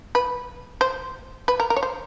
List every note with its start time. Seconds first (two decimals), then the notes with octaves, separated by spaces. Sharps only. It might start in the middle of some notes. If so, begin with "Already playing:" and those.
0.15 B4
0.81 C5
1.48 B4
1.60 A#4
1.70 A#4
1.76 C#5
1.83 C5